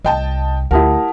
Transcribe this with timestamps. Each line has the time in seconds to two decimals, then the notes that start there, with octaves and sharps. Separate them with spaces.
0.05 C2 D#5 G5 A5
0.71 D2 E4 G4 A#4 F#5 A5 D#6